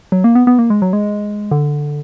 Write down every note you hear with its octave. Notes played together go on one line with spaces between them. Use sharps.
F#3
A#3
B3
B3
A#3
G#3
F#3
G#3
D3